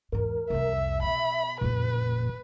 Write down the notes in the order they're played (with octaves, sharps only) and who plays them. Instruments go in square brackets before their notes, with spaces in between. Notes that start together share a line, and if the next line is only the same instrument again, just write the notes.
[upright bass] E2 G#2 [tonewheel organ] A#4
[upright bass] C2 F2 [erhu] E5
[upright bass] B2 [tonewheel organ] E5 [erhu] B5
[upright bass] F#1 F2 [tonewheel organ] A#2 [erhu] B4